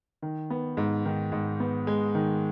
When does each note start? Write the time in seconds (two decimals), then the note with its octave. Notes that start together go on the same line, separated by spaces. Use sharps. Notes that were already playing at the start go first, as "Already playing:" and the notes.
0.22 D#3
0.50 B3
0.77 G#2
1.05 D#3
1.32 G#2
1.60 B3
1.87 G#3
2.15 D#3